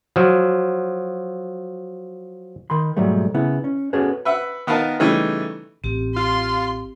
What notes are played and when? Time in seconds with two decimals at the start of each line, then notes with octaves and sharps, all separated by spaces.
0.16 F3 F#3
2.70 D#3 B5 C6
2.97 G#2 B2 F#3 G3 A3
3.34 C#3 B3 E4
3.64 C#4
3.93 B3 C#4 F#4 G#4 A4 B4
4.25 B4 E5 F#5
4.67 D#3 B3 A#4 D#5 F5 A5
5.00 C#3 E3 G3 A3 D#4
5.84 A1 C4 G4
6.16 F4 C6